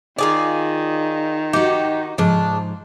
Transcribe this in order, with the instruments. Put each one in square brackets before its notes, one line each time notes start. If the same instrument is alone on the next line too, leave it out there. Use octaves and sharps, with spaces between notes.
[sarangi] D#3 [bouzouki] F4 G#4 D5
[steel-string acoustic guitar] D#4 F#4 [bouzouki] G4
[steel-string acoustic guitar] G#2 F3 [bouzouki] C#3 D4